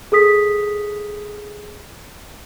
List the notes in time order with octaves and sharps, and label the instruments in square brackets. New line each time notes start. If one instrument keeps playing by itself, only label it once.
[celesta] G#4 A4 D#6 B6